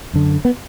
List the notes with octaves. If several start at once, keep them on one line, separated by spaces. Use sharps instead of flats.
F#2 D3
B3